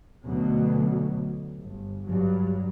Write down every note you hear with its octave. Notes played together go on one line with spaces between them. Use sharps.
D2 B2 F#3
G1
G2 F#3